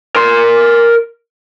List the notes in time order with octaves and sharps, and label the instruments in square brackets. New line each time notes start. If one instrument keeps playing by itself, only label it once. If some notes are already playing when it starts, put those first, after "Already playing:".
[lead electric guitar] A#4 C6